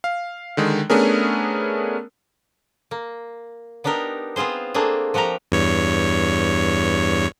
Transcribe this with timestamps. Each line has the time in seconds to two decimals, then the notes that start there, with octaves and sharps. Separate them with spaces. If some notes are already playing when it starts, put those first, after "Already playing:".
0.04 F5
0.57 D3 D#3 G#3
0.90 A3 B3 C#4 D4 G#4 A#4
2.91 A#3
3.84 B3 D4 D#4 G4 A#4
4.36 B3 C4 F4 G#4 C5
4.74 A3 A#3 C4 D4 G#4
5.14 F3 F#4 G4 A#4 A#5
5.52 E2 G2 C#5